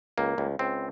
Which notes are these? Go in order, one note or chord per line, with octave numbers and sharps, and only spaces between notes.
C#2 A#3
C#2
C#2 C4